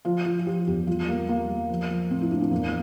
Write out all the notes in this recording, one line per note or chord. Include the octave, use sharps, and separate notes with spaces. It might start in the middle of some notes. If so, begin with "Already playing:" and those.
F3 F4
F3 F4
F4
F3 G4
E2 G4
G3 F4
G3 A#3
G3 A#3
G3
F3
F3
A2 C4
E4
A2 D4
C4
E2 A#3